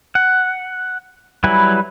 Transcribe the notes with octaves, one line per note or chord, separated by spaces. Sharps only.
F#5
F#3 G3 E4 B4 G#5